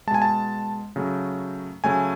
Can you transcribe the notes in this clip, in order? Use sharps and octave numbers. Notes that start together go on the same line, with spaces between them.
B2 G#3 G#5 A5
A5
C#3 F#3 A3
C#3 F#3 A3 G#5